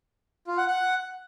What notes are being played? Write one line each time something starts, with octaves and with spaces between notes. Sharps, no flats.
F4
F#5
F#5